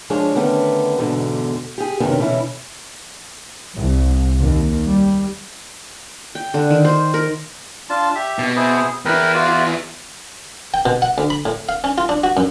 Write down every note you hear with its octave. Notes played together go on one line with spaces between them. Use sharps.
F3 G#3 D4 G#4 C#5
D3 D#3 A3 B3 C#4 D4
E2 G#2 B2 D3
G4 G#4
F#2 C3 D#3 B3 C#4 D4
B2 D3 E3 C#4 E4
C2
D#2
G3
G5
D3
D#3
C5
A#4
D4 F4 A5
G4 E5
B2
E4 G#4 C5
E2 E4 A#4 B4 G5
F4 F#4 D5
G5
B2
F#5
D2
B5
A2
F5
C#4
F4
D4
F#4
F#2